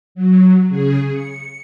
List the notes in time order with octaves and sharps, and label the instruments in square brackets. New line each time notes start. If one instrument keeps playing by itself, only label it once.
[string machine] F#3
C#3 G#4
C#7